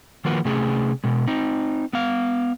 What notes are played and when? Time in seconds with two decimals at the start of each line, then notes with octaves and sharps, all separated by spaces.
0.25 D#3 F3 A#3 F#4 B4
0.45 C3 A3 C#4 G#4
1.04 B2 G#3
1.28 C4 D#4
1.93 B3 F5